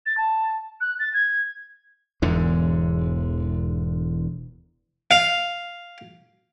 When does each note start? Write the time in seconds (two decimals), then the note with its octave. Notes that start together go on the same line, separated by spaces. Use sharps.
0.06 A6
0.17 A5
0.81 F#6
0.99 A6
1.14 G#6
2.22 E1 E2 G#2 D3
5.11 F5